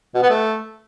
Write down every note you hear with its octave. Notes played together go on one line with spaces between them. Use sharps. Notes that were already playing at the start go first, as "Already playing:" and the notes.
B2
B3
A3